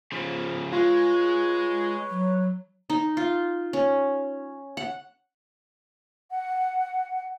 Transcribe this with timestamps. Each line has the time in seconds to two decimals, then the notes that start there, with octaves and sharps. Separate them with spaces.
0.12 C#3 F3
0.73 G#3 F4 B4 C#5
2.10 F#3
2.90 D#4
3.17 F4
3.73 C#4
4.77 F#5
6.31 F#5